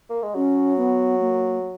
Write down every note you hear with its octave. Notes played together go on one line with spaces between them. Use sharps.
A#3
G#3
F#3 C#4
B3
A#3